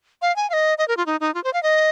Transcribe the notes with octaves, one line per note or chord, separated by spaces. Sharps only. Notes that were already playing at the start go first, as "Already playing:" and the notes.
F5
G#5
F5
D#5
D#5
A#4
F4
D#4
D#4
F4
C5
F5
D#5